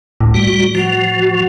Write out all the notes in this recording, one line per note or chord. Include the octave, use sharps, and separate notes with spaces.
D2 A2
G3 F#4
F3 F#4